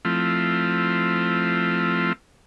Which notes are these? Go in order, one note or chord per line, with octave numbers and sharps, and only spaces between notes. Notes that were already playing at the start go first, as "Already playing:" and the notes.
F3 A3 C4 E4 F4